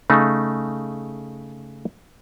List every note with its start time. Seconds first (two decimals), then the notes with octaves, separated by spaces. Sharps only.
0.10 C#3 A3 D#4